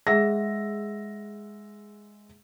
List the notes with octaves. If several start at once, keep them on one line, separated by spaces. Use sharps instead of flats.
G#3 G#4 E5 F#5 E6 A#6